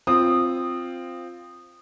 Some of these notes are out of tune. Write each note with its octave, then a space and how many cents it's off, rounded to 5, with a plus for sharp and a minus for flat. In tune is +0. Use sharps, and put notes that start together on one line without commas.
C4 +0 F4 +0 D#6 -15